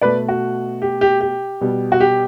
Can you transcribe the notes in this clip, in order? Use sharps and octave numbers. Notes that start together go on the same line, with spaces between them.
B2 A3 B4 D5
F#4
G4
G4
G4
B2 G3
F#4
G4